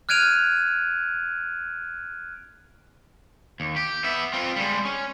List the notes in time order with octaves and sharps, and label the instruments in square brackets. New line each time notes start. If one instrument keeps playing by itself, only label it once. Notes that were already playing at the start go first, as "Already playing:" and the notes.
[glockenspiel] F6 F#6 G#6 D7 D#7 F7
[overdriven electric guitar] D#2
G4
B3 E5
C4 F4
G3 G#3
C#4